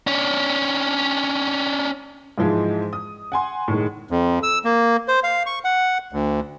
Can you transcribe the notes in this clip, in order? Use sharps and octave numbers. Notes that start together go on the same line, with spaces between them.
C#4 D4
G#2 E3 F3 G#3
D#6
F#5 G#5 C6
A2 D#3 G#3
F2
E6
A#3
C5
F5
C#6
F#5
D2